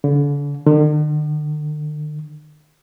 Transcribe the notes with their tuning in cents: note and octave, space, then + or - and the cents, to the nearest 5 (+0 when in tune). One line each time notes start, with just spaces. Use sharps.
D3 -40
D3 +45